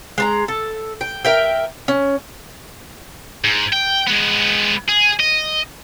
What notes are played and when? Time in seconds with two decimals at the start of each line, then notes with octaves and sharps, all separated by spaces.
0.18 G#3 A5 A#5
0.48 A4
1.01 G5
1.25 A#4 E5 G5
1.88 C#4
3.44 G#2
3.73 G5
4.07 G#3 B3
4.88 G#4
5.19 D#5